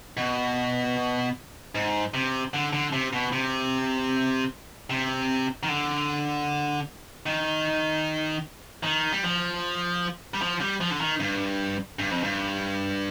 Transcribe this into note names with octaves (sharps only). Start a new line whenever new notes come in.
B2
G#2
C3
D3
D3
C3
B2
C3
C3
D#3
D3
D#3
D#3
G3
F3
G3
F3
G3
F3
D3
D#3
G2
G2
F2
G2